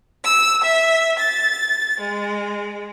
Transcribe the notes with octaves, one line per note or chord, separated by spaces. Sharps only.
E6
E5
A6
G#3